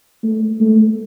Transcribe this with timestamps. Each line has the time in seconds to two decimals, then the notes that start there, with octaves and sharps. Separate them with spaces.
0.23 A3
0.61 A3